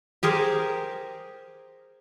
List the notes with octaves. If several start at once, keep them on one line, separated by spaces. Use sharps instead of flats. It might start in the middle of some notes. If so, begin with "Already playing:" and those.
G4 G#4 A#4 C5